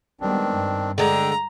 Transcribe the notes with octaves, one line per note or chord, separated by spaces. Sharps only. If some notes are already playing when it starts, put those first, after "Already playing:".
D#3 G3 G#3 B3 C4 D4
G2
D3 G#3 G5 A#5